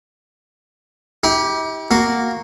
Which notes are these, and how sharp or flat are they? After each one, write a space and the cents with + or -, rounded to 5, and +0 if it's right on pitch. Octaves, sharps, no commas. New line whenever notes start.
E4 -45 G4 +0
A#3 -5 F#4 +0